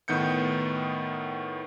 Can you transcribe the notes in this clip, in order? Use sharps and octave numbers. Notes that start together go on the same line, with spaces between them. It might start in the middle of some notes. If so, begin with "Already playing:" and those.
A2 D#3 B3 G6 C#7